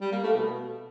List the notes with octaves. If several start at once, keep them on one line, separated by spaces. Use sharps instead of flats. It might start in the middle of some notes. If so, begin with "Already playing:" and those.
G3
A#3
A3
B2